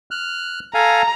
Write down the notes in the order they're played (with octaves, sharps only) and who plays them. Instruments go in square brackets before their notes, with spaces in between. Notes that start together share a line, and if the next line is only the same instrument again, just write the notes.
[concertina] F6 F#6
[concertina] A4 F5 G#5 [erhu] A#5